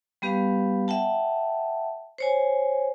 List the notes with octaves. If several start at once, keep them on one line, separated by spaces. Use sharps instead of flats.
G3 B3 G4 B4 F5
E5 F#5 G5 A5
C5 C#5 G#5